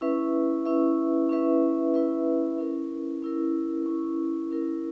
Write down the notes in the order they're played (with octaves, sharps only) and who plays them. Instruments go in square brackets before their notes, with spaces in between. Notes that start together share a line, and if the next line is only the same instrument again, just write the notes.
[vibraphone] C#4 E4 B4 E5
C#4 E4 B4 E5
C#4 E4 B4 E5
C#4 E4 B4 E5
C#4 E4 A#4
C#4 E4 A#4
C#4 E4 A#4
C#4 E4 A#4